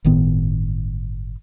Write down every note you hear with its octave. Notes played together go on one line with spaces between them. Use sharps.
G1 A2 D#3 B3